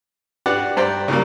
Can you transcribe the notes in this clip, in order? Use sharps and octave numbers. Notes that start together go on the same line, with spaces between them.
D4 F#4 G4 B4 D5 F#5
G2 C5 D5 G5 A#5
C#3 F#3 G3 A#3